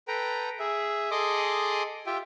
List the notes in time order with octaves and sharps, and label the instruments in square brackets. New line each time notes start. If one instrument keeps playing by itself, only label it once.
[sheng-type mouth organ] A4 B4 G5 A#5
G#4 E5
G#4 A4 D#5 C6 D6 D#6
F4 G4 E5 G5